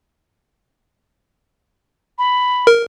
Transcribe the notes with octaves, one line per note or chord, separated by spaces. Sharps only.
B5
A#4